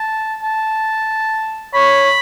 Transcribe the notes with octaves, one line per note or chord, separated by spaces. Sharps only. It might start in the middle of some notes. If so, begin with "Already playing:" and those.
Already playing: A5
A5
C#5 B5